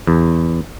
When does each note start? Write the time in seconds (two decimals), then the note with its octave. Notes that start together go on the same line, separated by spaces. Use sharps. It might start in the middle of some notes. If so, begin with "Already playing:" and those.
0.07 E2